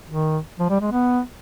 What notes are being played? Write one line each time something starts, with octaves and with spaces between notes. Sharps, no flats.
D#3
F3
G3
G#3
B3